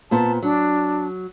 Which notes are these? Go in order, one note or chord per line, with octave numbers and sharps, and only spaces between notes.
A#2 B3 C5 A5
F#3 D4